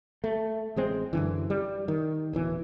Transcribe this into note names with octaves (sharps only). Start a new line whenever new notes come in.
A3
A1 G#3 C4
F#2 D3 E3
G3
D#3
D1 B1 E3